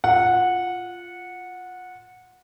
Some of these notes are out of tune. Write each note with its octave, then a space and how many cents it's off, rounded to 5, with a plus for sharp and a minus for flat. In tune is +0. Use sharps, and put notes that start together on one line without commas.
F4 +0 F#5 -15